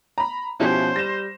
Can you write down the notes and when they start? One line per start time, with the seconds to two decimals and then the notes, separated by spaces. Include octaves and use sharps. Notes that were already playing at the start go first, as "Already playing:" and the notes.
0.18 A#5 B5
0.60 B2 F3 C#4 E4 G4 C5
0.96 G3 A#6 E7